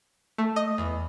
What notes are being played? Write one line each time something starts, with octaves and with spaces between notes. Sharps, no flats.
A3
D#5
E2